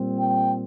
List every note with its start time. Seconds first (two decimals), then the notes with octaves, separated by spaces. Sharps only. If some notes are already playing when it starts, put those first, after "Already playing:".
Already playing: A#2 G3 C4
0.18 G5